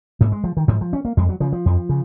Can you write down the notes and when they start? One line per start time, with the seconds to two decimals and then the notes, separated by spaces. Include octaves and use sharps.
0.21 G#2 A#3
0.32 G#3
0.44 F3
0.57 D#3
0.68 G#2 F3
0.81 F3
0.93 C#4
1.05 A#3
1.17 F2 G#3
1.29 F#3
1.40 C#3 F3
1.52 F3
1.66 F2
1.89 C#3